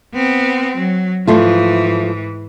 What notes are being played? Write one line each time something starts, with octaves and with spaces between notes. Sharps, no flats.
B3 C4
F#3
G#2 E3 F3 A3 F4